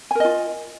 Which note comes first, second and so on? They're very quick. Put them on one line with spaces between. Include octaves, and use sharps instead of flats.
G#5 A#4 D#5 F4